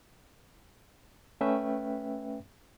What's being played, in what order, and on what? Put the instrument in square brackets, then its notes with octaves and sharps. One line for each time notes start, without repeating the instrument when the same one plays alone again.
[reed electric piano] A3 C#4 B4 E5 G5